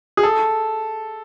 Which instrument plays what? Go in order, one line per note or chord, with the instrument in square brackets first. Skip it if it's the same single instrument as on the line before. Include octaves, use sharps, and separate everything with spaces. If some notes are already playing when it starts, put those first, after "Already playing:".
[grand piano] G#4
A4